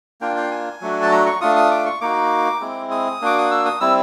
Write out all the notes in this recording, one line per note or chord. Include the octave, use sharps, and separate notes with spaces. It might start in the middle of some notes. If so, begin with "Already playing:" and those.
A#3 D4 F4 G5
G5
G#5
F#3 A3 D4 F#4
A5
A#5
C#6
A3 D4 F4 D#6
D#6
D6
C#6
A#3 D#4 F#4 D6
G#3 C4 E4
D#6
A#3 D4 F#4 D6
D#6
E6
D#6
G3 C4 E4 E6